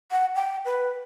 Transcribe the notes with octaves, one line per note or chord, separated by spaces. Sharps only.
F#5
G5
B4